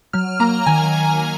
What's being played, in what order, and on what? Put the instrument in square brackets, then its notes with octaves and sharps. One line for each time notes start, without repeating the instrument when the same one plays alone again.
[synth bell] F#3 F6
A#3 A#5
D#3 G#5